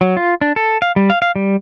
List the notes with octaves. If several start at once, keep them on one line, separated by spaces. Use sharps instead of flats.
F#3
F4
D4
A4
F5
G3
F5
F5
G3